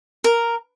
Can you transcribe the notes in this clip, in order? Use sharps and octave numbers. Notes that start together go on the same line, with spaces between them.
A#4